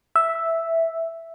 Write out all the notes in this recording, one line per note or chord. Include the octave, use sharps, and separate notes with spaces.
E5